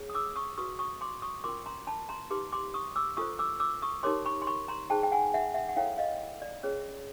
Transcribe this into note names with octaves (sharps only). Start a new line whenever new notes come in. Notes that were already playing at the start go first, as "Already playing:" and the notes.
Already playing: G#4 C#5
D#6
D6 E6
C#6 D#6
F#4 B4 C#6 D#6
C#6 D#6
C6 D6
C#6 D#6
C#4 F4 A#4 C6 D6
A#5 C6
A5 B5
A#5 C6
D#4 G4 B4 C6 D6
C6 D6
C#6 D#6
D6 E6
F4 A4 C5 C#6 D#6
D6 E6
D6 E6
C#6 D#6
D#4 G4 A#4 C#5 C6 D6
B5 C#6
C6
B5 C#6
A#5 C6
D#4 G#4 C5 G5 A5
G5
F#5 G#5
E5 F#5
E5 F#5
F#5
E4 A4 C#5 F5 G5
D#5 F5
D5
C#4 F4 G#4 B4 C#5